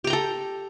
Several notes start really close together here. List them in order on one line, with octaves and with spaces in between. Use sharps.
G4 A#5 G5 A4